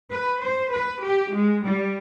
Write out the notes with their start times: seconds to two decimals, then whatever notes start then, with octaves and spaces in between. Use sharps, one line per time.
0.11 B4
0.42 C5
0.72 B4
1.02 G4
1.34 G#3
1.64 G3